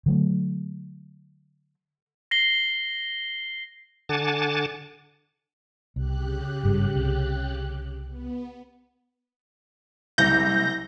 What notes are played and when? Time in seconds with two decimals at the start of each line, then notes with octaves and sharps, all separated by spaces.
0.06 D3 F#3 A3
2.31 A#6 C7 G7
4.09 D3 F#5 G#5 A5 D6 A6
5.96 C2 C#3 G4 F#6
6.63 G#1 G2
6.95 C2
8.09 B3
10.18 F#1 C2 G6 A#6